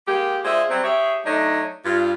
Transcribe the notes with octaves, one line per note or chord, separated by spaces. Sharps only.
G#3 A#3 G4
G#3 D4 F4 C5 E5
F#3 G3 C4
G4 G#4 C#5 E5
F#3 A3 D4 D#4 C#5
G2 F4